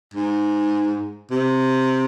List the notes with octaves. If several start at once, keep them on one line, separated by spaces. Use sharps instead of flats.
G#2
C3